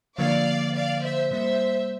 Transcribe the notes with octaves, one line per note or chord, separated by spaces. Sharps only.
D3 F3 A#3 D5 F5
D5 F5
C5 E5
C3 G3 A#3 C5 E5